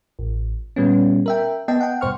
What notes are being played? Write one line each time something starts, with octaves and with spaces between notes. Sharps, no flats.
A1
A#2 G3 B3 C#4
A#4 E5 G5
B3 D#5 G5 A5
F#5 G5
G2 B2 C5 C#6 F6